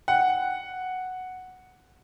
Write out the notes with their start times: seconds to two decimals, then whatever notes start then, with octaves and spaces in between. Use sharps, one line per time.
0.08 F#5 G5